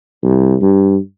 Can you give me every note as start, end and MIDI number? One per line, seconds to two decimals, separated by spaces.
0.23 0.56 36
0.61 0.96 43